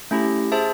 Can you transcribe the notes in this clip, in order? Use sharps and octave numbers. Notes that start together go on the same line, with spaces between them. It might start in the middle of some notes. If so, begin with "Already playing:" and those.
A3 C#4 E4 G4
G#4 C5 E5 A5